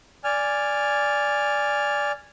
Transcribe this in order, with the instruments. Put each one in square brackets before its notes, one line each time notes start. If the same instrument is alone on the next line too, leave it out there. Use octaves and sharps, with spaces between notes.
[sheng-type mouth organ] D5 G#5 F6